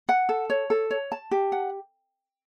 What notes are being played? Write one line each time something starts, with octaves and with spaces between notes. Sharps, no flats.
F#5
A4
C#5
A4
C#5
A5
G4
F#5